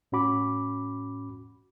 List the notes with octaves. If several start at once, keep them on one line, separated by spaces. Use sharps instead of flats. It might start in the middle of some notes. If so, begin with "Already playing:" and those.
A2 C#4 F#4 B5 D6